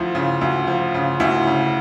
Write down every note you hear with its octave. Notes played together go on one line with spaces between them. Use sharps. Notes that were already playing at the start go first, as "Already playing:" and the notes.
Already playing: D2 F3 E4
C#3
D2
F3
C#3
D2 E4
C#3